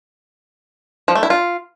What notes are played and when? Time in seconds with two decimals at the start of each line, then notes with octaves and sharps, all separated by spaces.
1.08 F3
1.15 A3
1.23 E4
1.30 F4